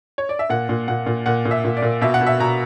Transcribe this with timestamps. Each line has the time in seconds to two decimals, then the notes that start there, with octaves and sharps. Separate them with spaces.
0.18 C#5
0.29 D5
0.39 E5
0.50 A#2 F#5
0.69 A#2
0.88 A#2 F#5
1.06 A#2
1.26 A#2 F#5
1.45 A#2
1.51 E5
1.64 A#2
1.77 D5
1.82 A#2
2.01 B2 E5
2.14 F#5
2.21 B2
2.27 E5
2.40 B2 A#5